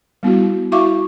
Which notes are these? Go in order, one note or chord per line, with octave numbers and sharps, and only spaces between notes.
G3 B3 E4 F#4
E4 F#4 E5 F5 C#6 D6